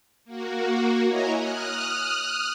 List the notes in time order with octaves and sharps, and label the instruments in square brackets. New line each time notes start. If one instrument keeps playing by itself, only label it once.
[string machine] A#3 F#4
E4 C#5 D#5 G#5 A#5
D#6 F6 F#6